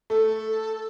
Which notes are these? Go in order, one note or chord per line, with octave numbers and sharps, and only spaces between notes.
A3 A4